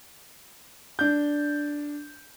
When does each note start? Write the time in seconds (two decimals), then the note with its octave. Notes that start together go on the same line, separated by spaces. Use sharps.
0.99 D4 G6